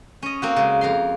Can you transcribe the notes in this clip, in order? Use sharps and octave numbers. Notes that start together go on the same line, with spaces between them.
C#4 D#5
A#3 C4 F#4
C#3 G#3
F2 A#4 F5 C6